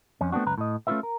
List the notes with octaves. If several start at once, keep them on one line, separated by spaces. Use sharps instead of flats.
F2 C#4
A3 B3 C4 D4 F#4
C#2 F#2 B4 A#5
A2 D#5
A3 C#4 D#4 F4 B4 E5
A#4